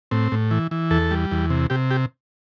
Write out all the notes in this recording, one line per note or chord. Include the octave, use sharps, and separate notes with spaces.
A2 C4
A2
E3
E3
E2 A4
G3
E2
C3
C3 G4
G4